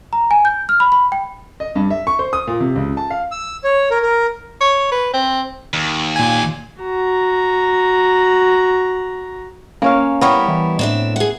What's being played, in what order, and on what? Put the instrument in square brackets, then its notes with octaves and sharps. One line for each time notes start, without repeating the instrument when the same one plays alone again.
[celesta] A#5
G#5
G6
F6
B5
B5
G5
[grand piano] D#5
G2
E5
C#6
C5
D#6
A#2
C3
C#2
A5
F5
[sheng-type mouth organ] E6
C#5
A#4
A#4
[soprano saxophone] C#5
B4
C4
[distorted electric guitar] D#2
[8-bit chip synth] A#2 G#5
[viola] F#4 A#5
[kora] A#3 C#5 F5 [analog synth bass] C#4
[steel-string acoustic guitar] G3 E4 G4 [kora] B3 A#4 C#5
[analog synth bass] E3
[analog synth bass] A2 [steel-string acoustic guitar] C4 D4 E5
[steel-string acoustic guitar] G#4 F#5